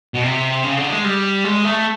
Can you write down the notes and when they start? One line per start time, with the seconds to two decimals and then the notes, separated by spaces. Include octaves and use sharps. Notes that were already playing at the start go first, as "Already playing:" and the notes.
0.14 B2
0.23 C3
0.64 C#3
0.77 D3
0.90 G#3
1.04 G3
1.45 G#3
1.65 A3